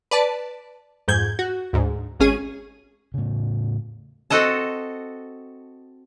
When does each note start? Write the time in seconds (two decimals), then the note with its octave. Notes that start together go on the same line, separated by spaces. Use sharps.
0.11 B4 D5 A5
1.08 F2 G#2 G6 G#6
1.39 F#4
1.73 D2 G#2
2.20 G#1 C#4 G#4 D#7
3.14 A2 C#3
4.30 C4 F#4 A4 D#5 A5